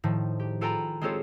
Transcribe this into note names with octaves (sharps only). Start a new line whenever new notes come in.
A2 D#3 F3
G4
F4 A4 B4 G5 G#5 A#5
G#3 C4 F4 G4 A4 C#5